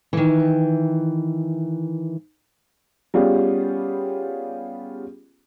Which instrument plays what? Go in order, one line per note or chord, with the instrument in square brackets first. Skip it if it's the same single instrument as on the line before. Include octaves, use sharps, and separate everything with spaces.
[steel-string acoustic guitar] D#3 E3
[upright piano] G3 B3 C#4 F4 G4 G#4